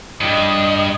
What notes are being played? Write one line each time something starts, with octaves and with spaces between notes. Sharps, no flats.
G2 D#5